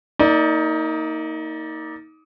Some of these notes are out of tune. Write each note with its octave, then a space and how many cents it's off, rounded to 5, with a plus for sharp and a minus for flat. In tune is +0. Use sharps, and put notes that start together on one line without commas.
A#3 -15 D#4 +25 D5 +0